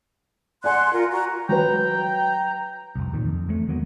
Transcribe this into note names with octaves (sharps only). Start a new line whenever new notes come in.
D5 F#5 G#5 C6 F#6
F4 A#4
F#4 A#5
F#3 B4 G5 A#5
F1 C2
D#2 A#2 D#3
F2
E2 G#3 A3
D#3 F#3 A#3 B3